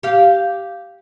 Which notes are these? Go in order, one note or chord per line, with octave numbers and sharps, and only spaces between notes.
G4 F5